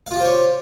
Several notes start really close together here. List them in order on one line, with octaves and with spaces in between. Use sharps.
F5 F4 G4 C5 C#5